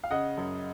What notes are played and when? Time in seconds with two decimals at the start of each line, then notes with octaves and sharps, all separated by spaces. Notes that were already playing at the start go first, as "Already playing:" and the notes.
0.04 F5
0.10 C#3 D#5 F#5
0.38 F#2